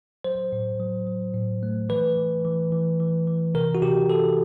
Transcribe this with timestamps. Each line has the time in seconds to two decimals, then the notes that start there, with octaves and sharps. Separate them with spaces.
0.24 F#3 C5
0.52 A2
0.79 F#3
1.07 F#3
1.34 A2
1.63 A3
1.89 E3 B4
2.17 E3
2.45 E3
2.72 E3
3.00 E3
3.27 E3
3.54 C3 A#4
3.75 F#4
3.82 C3 G4
4.10 C3 A4